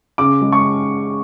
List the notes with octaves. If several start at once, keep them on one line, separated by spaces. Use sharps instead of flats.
C#3 D6
G#3
C#6